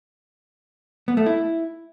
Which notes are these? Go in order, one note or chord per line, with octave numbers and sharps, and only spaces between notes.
B3
A3
E4